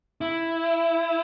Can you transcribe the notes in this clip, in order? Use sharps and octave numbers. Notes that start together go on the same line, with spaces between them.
E4